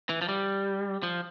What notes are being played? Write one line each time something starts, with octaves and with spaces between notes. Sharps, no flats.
E3
F3
G3
F3